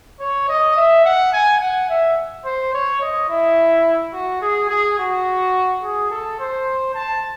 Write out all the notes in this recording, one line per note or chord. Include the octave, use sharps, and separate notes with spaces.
C#5
D#5
E5
F#5
G#5
F#5
E5
C5
C#5
D#5
E4
F#4
G#4
G#4
F#4
G#4
A4
C5
A5